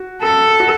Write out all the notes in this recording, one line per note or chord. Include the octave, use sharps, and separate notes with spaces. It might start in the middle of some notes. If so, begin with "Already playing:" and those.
Already playing: F#4
A4
F#4